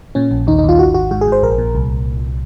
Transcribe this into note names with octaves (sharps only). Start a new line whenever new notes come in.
A#2 C#4
A#1
D#2 D#4
D#4
D#2 F4
G#1 F#4
G#1 F#4
G#2 F#4
G#4
G#2 C5
A#1 A#4
A#2
C2